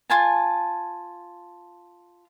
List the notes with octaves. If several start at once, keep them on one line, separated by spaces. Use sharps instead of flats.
F4 G#5 A5